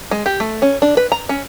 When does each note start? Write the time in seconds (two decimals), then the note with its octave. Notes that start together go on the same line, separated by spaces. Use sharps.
0.11 G#3
0.26 G4
0.40 A3
0.62 C#4
0.82 D4
0.97 B4
1.12 A#5
1.29 C#4